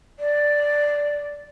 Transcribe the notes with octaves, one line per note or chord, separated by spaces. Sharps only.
D5